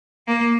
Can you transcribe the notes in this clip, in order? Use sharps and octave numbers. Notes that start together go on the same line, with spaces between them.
A#3